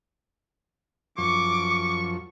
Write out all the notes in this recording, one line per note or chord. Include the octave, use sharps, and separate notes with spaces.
F#2 F3 C#6 D6